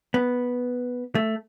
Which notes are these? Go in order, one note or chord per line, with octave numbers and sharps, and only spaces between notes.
B3
A3